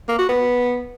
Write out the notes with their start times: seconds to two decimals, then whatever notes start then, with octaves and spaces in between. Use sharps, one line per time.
0.08 A#3
0.18 F#4
0.29 B3